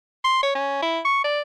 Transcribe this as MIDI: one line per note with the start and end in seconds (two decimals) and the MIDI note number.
0.24 0.42 84
0.43 0.52 73
0.55 0.77 61
0.82 1.00 64
1.05 1.23 85
1.24 1.41 74